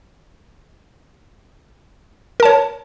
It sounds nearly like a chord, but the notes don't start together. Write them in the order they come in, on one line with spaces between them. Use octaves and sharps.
A#4 A5 C#5